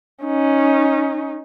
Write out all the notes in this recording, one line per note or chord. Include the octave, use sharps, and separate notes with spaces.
C#4 D#4